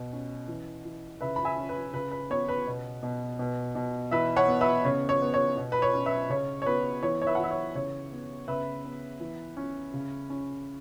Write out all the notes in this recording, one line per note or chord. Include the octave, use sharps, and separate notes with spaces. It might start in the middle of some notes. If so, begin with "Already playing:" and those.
Already playing: B2
C#4
E3
E3
C#3 B4 E5
B5
E5 G#5
C#4
B4
C#3 B4
B4
B3 C#5
B4
B2
B2
B2
B2
E3 B4 E5
C#5 F#5
B3
B4 E5
C#3 C#5
C#5
B3
C#5
B2
B4
C#5
C#4
B4 E5
C#3 C#5
C#5
B3 B4
E3 C#5
C#5
B4 E5
F#5
E3 E5
C#5
C#3 C#5
B3
C#3 B4 E5
B3
E3
C#4
C#3
C#4